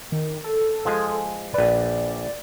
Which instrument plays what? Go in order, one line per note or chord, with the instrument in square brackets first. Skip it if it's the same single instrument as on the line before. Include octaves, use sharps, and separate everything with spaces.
[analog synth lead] D#3
A4
[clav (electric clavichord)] F3 G#3 G#4
[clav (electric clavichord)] A#1 B4 [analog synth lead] D5